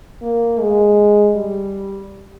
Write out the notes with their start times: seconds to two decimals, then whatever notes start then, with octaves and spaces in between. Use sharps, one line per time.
0.22 A#3
0.60 G#3
1.36 G3